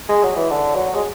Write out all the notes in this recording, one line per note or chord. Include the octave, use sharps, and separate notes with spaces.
G#3
F#3
E3
D3
F#3
G#3